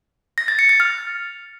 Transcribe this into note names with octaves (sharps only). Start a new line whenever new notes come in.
A#6
A6
C#7
A6
F6